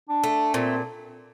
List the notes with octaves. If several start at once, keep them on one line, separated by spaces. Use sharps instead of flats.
D4
A3
A#2 C4